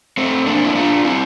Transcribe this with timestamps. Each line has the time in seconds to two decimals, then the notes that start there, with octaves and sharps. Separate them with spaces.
0.17 A3 C4
0.46 A#3 D4
0.65 E4
0.75 D4 F4
1.04 C4 E4